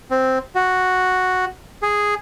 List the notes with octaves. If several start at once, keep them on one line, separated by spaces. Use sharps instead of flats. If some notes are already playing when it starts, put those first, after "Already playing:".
C4
F#4
G#4